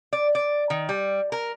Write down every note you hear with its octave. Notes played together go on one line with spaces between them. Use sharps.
D5
D5
D#3
G3
A#4